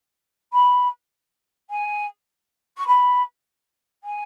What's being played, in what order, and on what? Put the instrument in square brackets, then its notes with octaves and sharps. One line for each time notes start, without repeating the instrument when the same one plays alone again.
[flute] B5
G#5
C#6
B5
G#5